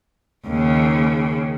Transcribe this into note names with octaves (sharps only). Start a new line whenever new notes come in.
D#2 C#3